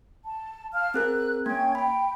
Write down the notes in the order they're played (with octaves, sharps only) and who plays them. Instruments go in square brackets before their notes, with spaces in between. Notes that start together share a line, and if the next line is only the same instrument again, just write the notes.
[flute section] A5
F5 A5 F6
[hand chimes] C4 G#4 A#4 [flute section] F#6
[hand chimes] A#3 [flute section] C#4 G5 G#6
[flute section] G5 [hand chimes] B5